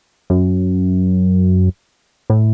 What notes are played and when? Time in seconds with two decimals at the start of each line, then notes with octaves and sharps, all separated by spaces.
0.30 F#2
2.30 A2